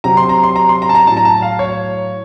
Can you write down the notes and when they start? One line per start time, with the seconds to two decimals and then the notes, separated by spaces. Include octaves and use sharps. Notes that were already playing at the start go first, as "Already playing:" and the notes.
0.04 C3 F#3 A#5
0.17 C6
0.29 A#5
0.43 C6
0.56 A#5
0.69 C6
0.82 A#5
0.89 A5
0.95 A#5
1.07 A2 F#3 A5
1.17 A#5
1.25 A5
1.42 F5
1.59 C#5